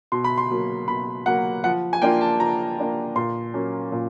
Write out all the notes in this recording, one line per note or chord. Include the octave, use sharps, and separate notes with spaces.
B2 C6
B5
C6
F#3 A#3
B2 B5
F#3 A#3 F#5
F3 F#5
G#5
A#3 D4 F4 G5
A5
F3 A#5
A#3 D4 F4
A#2 C6
F#3 A#3 C#4
A#2